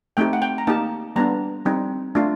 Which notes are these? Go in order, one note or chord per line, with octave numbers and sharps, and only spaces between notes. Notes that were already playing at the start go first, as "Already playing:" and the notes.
A3 C4 D#4 G4 G5
F#5
G5
A#5
A#3 D#4 G4 A5
G3 B3 D4 A#5
G3 C4 D#4
A3 D4 F4